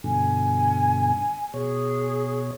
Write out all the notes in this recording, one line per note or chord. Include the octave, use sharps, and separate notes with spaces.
G2 B2 D3 G#5
B2 G#4 C#5